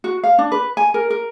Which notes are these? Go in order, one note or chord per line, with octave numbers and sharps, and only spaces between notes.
F#4
F5
D4
B4
G#5
A#4
A#4